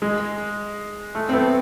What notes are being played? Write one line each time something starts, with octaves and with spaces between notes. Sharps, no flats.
G#3
A3
C4
A3 B3